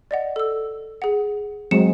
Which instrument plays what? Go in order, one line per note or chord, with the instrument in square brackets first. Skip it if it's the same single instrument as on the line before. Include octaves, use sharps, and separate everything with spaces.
[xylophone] D5 D#5 F#5
A4 E6
G#4 F#5
[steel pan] F#3 G#3 C4 [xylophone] C#7 E7